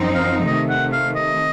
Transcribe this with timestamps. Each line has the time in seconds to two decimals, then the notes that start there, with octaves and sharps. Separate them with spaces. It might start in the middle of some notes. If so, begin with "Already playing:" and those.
Already playing: F#2 F3 C4 D#4
0.15 F5
0.46 C3 D#3 A3 D#5
0.69 F#5
0.93 F5
1.16 D#5